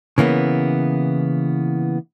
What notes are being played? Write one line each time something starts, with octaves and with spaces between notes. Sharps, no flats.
C#3 E3 A#3 B3